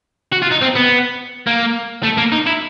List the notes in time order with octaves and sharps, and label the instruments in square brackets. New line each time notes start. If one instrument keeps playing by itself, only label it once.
[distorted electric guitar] F#4
F4
D#4
C4
B3
A#3
A3
A#3
D#4
E4